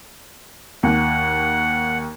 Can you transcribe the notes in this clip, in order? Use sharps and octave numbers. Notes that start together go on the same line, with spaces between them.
D#2 F#5